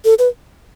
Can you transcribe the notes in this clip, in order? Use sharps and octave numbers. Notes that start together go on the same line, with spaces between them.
A4
B4